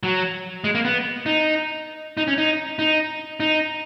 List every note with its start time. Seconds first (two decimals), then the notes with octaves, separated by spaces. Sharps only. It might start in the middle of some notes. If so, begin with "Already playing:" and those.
0.03 F#3
0.64 G#3
0.75 A#3
0.85 B3
1.26 D#4
2.17 D#4
2.28 C#4
2.38 D#4
2.79 D#4
3.40 D#4